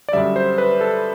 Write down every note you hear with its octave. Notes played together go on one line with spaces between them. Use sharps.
D5
F#2 D3 G3 E5
C5
B4
A4